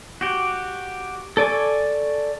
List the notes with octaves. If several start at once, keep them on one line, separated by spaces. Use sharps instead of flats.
F#4 G4
A4 D5 G#5 C#6